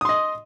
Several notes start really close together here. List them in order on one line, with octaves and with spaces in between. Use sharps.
D#6 C6 D#5